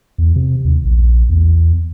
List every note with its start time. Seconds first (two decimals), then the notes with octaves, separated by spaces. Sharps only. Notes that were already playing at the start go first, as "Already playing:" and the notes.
0.18 E2
0.36 C3
0.65 D#2
0.85 A#1
1.29 E2